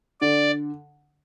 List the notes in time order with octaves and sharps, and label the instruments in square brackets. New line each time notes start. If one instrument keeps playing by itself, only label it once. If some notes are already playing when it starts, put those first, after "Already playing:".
[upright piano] D3 [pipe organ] D5